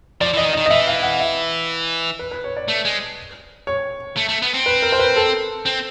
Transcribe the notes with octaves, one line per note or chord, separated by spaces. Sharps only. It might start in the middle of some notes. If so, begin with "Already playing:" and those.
F3 D5
E3 D#5
D#3
D#5
D#3
D#5
E3 E5
F5
F#5
E5
B4
B4
C#5
D5
A3
G#3
C#5
A3
A3
B3
C4
B4
A#4
C5
B4
A4
C4